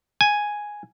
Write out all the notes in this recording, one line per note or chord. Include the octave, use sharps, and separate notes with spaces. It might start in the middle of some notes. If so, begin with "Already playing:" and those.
G#5